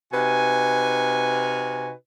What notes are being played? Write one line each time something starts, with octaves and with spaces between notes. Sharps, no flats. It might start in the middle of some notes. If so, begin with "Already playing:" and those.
C3 D#4 F#4 B4 G#5